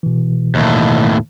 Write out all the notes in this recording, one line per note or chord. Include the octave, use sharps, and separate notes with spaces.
B2 E3
D#2 A2